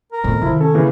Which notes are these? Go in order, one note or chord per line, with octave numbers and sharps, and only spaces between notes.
A#4
F2 A2 B3
C3 D#3 F3 E4
C#4 A4
C#3 E3 A#3